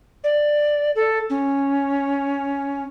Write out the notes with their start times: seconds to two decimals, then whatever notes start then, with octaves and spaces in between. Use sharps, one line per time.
0.24 D5
0.96 A4
1.30 C#4